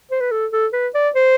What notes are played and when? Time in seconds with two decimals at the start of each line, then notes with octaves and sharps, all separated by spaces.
0.11 C5
0.20 B4
0.31 A4
0.52 A4
0.73 B4
0.94 D5
1.15 C5